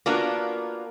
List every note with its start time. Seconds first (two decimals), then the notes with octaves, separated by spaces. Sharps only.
0.06 A#3 B3 D4 F4 F#4 A#4